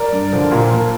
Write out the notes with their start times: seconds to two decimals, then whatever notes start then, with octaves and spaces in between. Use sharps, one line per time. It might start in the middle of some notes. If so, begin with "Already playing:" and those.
Already playing: A#4 D5
0.13 G2
0.33 D3 F3
0.52 A#2 F4 A#4
0.71 F3 A#3